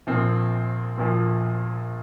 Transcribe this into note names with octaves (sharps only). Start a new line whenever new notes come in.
A#1 A#2 F3 C4
A#1 A#2 F3